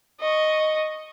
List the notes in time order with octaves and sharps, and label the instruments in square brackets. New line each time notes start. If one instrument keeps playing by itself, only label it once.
[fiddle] D#5 C#6